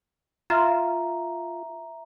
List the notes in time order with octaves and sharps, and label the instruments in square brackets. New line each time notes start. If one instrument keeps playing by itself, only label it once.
[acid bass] F4 [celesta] E5 A#5